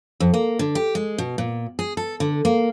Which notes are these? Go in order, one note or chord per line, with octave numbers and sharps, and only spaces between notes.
F2
A#3
D3
G4
G#3
B2
A#2
G#4
A4
D3
A#3